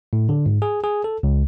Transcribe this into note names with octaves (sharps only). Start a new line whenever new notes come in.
A2
D3
G#2
G#4
G#4
A4
C#2